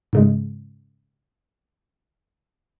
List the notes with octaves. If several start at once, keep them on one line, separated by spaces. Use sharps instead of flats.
G#2 C#3 G#3